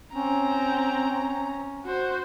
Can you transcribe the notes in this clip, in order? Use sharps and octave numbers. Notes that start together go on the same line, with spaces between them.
C4 C#4 A#5
F#4 C5